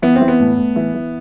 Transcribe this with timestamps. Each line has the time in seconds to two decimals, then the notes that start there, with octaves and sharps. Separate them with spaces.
0.02 E3 B3
0.16 C4
0.21 E3
0.28 B3
0.40 A2
0.58 A2
0.76 E3
0.94 E3